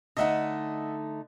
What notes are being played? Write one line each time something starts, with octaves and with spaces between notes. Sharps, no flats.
D3 A3 D#4 D#5 E5 F#5